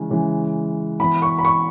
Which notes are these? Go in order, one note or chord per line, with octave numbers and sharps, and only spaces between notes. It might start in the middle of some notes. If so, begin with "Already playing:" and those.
Already playing: C#3 E3 G#3
C#3 E3 G#3
E3 B3 B5
C#6
B5
C#6